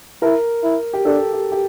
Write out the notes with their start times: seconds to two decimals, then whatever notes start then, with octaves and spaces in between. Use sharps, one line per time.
0.22 E4 A#4
0.64 E4
0.93 G4
1.05 D4 A4
1.33 G4
1.52 G4